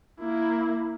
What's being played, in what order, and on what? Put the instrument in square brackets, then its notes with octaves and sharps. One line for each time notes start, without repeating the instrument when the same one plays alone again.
[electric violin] A#3 E4